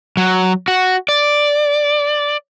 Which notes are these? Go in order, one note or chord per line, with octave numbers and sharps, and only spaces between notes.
F#3
F#4
D5